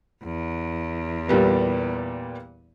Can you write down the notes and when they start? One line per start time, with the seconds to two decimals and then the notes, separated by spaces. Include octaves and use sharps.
0.24 E2
1.29 A#2 G3 B3